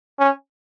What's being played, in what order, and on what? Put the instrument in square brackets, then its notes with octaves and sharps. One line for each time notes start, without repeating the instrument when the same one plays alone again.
[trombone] C#4